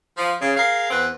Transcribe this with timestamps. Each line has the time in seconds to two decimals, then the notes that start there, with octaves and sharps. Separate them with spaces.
0.17 F3
0.41 C#3
0.56 G#4 A#4 F5
0.90 E2 B3 C4 B4